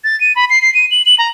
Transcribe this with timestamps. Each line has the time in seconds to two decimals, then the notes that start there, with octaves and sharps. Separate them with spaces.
0.04 A6
0.20 D#7
0.36 B5
0.50 C7
0.62 C7
0.74 D#7
0.91 F#7
1.06 F#7
1.19 A#5